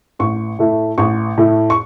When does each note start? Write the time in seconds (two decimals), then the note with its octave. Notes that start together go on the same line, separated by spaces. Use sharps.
0.19 A1 C#6
0.59 A2 A3 E4
0.98 A1 C#6
1.38 A2 A3 E4
1.70 C#6